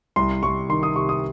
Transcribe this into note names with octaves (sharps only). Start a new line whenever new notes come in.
C2 C6
C2 C#6
D#3 C6
D#6
C3 C#6
D#6